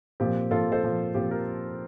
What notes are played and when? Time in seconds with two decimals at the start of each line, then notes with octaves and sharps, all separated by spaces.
0.20 A#2 F3 C4 G4
0.51 A#2 F3 C4 F4 A4
0.72 A4 C5
0.83 A#2 F3 C4
1.14 A#2 F3 C4 G4
1.31 G4 A#4